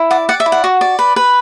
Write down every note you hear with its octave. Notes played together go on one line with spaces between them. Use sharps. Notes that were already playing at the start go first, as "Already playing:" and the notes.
Already playing: E4
D5 F#5
D5 F#5
E5
E4
F#5
F#4
D5
B4
B4